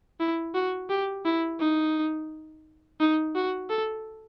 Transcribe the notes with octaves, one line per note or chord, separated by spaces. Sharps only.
E4
F#4
G4
E4
D#4
D#4
F#4
A4